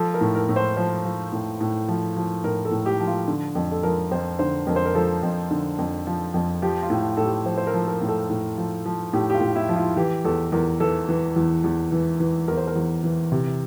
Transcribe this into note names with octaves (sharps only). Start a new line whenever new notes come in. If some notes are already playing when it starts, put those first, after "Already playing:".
Already playing: F3 A4
A#4
A2
A#4
A2
C5
F3 C5
F3
A2
A2
F3
F3
A2 A#4
A4
A2
G4
F3
F4
D3
F2
A4
F3 A#4
F2 C5
D3 C5
F2 A#4
C5
A#4
F3 A4
F2
D3
F2
F3
F2
F3 G4
F4
A2
A2 A4
G4
F3 C5
C5
A#4
F3
A#4
A2
A4
A2
F3
F3
A2 G4
G4
F4
A2
E4
F3
F4
E3 G4
E2 A4
E2 A#4
E3 A4
E3
E2
E2
E3
E3
E2 A#4
C5
A#4
E2
E3
C3